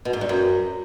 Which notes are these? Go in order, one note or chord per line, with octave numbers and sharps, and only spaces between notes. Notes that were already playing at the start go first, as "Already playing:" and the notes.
B2
G#2
G2
F#2